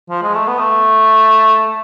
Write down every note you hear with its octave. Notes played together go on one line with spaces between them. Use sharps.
F3
G#3
A3
B3
A3